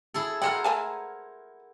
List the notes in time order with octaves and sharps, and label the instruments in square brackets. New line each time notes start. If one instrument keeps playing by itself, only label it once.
[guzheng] E4 G#4 A4
[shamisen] A4 D#5 G5 [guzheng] A#4 C5 F#5
[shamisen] A3 G#5 A5